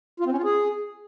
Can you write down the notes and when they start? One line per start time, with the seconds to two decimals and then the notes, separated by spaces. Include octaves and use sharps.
0.20 F4
0.26 C4
0.32 C#4
0.38 F4
0.44 G#4